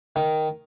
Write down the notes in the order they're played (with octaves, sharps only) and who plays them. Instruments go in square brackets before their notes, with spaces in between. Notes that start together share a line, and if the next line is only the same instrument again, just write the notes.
[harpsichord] D#3